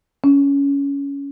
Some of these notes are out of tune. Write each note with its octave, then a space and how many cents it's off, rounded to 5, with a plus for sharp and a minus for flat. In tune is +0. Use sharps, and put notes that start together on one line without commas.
C#4 +15